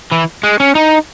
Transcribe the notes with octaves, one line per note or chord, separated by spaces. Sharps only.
E3
G#3
C#4
D#4